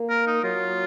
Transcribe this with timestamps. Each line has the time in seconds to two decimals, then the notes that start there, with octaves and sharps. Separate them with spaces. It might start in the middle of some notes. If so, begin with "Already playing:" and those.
Already playing: A#3
0.10 A#4
0.27 D#4
0.44 F#3 F4